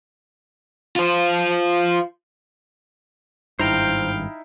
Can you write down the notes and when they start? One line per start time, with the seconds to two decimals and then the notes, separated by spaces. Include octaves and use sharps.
0.96 F4 C5
3.59 G#1 G2 D#4 E4 C5 F5 G5 A#5